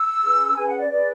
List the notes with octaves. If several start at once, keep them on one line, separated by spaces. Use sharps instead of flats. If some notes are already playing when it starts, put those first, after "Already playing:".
Already playing: E6
C#4 G#4 B4
C#4 G#4 B4 G#5
F#5
D5
C#4 G#4 B4 D5